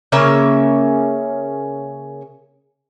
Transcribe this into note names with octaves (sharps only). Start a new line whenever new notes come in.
C#3 A#3 C#4 E5